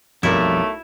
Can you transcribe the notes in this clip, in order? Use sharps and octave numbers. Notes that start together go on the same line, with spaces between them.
B1 F2 G3 A3 E4 A#4 D6